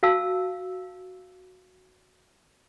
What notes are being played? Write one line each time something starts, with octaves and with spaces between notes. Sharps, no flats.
F#4 F5 A5 E6